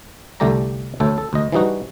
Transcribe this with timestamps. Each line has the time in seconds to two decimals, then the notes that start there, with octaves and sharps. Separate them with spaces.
0.40 C2 D3 A3 G4 D5 A#5
1.00 D2 A3 A4 C#5 G5
1.18 A4
1.33 D2 D#5
1.52 E3 F3 G3 D#4 F#4